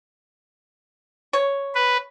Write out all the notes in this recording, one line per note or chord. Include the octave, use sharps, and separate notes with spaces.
C#5
B4